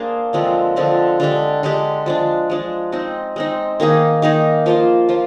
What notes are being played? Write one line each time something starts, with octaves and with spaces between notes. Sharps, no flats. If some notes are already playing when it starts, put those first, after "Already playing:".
Already playing: A#3 D4 G#4 C5
D3 F3 G#3 C4
D3 F3 G#3 C4
D3 G#3 D4 G4
D3 G#3 D4 G4
F3 G#3 D4
F3 G#3 D4
G#3 C4 D#4
G#3 C4 D#4
D#3 A#3 D#4 G#4
D#3 A#3 D#4 G#4
F3 A#3 F4 C5
F3 A#3 F4 C5